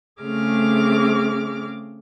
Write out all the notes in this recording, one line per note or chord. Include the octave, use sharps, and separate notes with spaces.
C#3 A3 C4 G#4 D6 F6